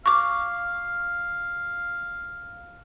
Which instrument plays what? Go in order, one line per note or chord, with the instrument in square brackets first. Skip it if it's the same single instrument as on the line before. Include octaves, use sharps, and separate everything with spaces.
[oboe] F5 [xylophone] C#6 D6